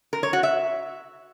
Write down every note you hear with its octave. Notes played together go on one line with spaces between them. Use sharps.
A#4
C#5
F#4
E5